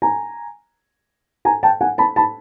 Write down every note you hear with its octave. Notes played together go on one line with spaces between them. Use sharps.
G#5 A#5
G#5 A#5
G5 A5
F#5 G#5
A5 B5
A5 B5